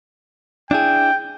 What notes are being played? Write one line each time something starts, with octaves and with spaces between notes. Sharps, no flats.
D4 E4 G#4 G5